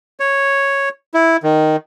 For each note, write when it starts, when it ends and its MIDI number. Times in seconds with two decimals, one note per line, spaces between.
0.20 0.89 73
1.14 1.37 64
1.43 1.76 51